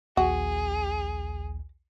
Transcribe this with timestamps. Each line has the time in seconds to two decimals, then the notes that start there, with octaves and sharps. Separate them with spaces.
0.17 A#1 D#2 F#4 G#4